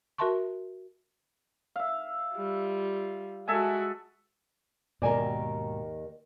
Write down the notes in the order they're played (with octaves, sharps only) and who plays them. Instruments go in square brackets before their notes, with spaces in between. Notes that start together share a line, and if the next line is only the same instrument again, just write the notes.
[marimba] F#4 A#4 E5 A5 C6 C#6
[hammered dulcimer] E5 F5
[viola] G3 F4
[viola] G#3 F#4 [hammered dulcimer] A4 E5 G#5
[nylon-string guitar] D#2 D#3 A#4 [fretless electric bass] G#2 B2 [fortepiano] D5 G#5